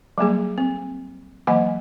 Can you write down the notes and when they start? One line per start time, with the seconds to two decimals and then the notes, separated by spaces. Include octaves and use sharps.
0.18 F#3 G3 A#3 G#4
0.58 C4
1.47 E3 F#3 A#3 D#5 F#5 G#5